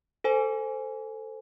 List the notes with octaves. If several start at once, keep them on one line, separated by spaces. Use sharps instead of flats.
A4 C5 G#5